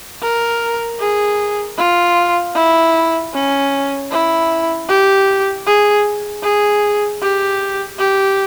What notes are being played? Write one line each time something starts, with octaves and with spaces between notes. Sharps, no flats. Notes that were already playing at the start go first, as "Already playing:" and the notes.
A#4
G#4
F4
E4
C#4
E4
G4
G#4
G#4
G4
G4